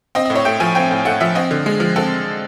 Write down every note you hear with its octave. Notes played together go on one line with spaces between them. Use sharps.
C4 D#5
D#5
A2
C#5
A3 G5
F3 G#5
C4 G5
A2
A3 F#5
F3 E5
C4 D#5
D3
G#3
F3
C4 A4